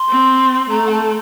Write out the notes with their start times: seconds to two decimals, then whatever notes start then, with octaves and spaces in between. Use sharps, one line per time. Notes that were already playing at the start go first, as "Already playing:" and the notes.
Already playing: C6
0.09 C4
0.70 A3 A#5
0.87 F#5
0.91 A5